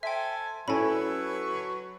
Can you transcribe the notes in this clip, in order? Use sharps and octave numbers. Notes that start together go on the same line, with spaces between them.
A4 C5 E5 G5 G#5
F#3 C#4 E4 A4 B4 G#5 B5 C#6